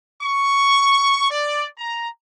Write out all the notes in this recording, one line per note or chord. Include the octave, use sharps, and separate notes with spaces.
C#6
D5
A#5